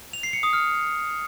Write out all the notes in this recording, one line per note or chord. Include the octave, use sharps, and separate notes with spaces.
F7
C7
C#7
D#6
F6